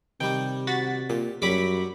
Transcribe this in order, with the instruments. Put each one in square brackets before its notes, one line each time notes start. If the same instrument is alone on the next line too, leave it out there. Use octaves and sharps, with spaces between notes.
[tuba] C3 [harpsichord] D#3 G3 [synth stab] G5
[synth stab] F#4 A6 B6
[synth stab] A#2 [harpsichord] G4
[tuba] F#2 [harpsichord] F#3 G3 F#4 [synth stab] B5 D6 B6